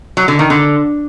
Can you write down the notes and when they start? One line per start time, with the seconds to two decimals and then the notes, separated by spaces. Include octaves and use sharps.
0.17 F#3
0.28 D3
0.39 D#3
0.50 D3